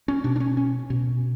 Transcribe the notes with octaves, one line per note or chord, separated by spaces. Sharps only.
C#4
B2 D4
D4
C#4
C#4
B2